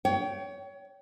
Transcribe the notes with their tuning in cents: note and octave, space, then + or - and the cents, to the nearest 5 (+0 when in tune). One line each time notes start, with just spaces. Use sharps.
C#5 +25 G5 -15